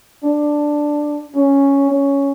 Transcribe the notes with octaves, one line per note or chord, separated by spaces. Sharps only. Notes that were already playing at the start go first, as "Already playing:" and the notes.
D4
C#4
C#4